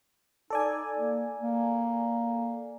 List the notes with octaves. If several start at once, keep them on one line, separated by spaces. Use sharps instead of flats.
D#4 A4 D5 G#5
A#3
A#3